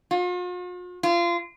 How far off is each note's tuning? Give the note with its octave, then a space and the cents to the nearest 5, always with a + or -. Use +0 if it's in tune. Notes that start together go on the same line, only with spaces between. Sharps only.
F4 +45
F4 -25